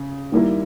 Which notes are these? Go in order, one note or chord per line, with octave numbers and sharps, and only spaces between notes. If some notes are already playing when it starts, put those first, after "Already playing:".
Already playing: C#3
D#2 D#3 G3 A#3 E4